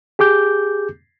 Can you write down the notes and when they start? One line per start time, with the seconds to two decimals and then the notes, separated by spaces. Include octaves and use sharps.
0.19 G4 G#4 D6 G6